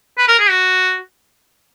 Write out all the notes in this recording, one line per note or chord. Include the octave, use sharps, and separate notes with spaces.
B4
A#4
G#4
F#4